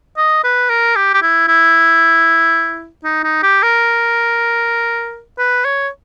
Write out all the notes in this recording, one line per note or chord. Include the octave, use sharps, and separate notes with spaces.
D#5
B4
A#4
G4
G4
E4
E4
D#4
D#4
G4
A#4
B4
C#5